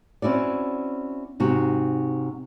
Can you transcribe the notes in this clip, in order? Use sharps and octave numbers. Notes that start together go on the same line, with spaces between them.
C4 C#4 E4 F#4 D5
G#2 C3 F#4